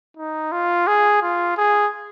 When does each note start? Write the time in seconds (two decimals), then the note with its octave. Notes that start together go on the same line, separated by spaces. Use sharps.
0.17 D#4
0.52 F4
0.87 G#4
1.22 F4
1.57 G#4